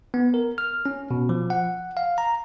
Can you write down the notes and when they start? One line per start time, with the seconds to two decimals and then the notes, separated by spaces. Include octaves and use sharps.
0.14 B3
0.34 A#4
0.58 F6
0.86 C#4
1.11 B2
1.29 F3
1.50 F#5
1.97 F5
2.18 A#5